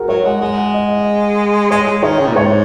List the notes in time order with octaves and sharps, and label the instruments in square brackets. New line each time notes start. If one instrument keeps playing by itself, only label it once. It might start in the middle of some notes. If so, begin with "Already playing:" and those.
Already playing: [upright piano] F#4 G#4 A#4
[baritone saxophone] F#3 [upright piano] C#5
[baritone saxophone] G#3 [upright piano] F#5
[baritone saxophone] G#3 [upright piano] D#5
[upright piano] F#5
D#5
D#5
[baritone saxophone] G#3 [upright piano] C#5
[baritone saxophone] G#3
[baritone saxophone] D#3 [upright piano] C#5
[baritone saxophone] C#3
A#2
[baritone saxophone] G#2 [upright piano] C#5